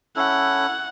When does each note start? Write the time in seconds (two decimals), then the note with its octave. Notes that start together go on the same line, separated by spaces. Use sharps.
0.16 C#4 E4 A4 F#5